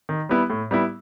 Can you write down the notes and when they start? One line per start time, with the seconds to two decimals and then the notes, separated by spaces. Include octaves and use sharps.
0.09 D#3
0.29 G3 B3 E4
0.50 A2
0.71 G3 B3 E4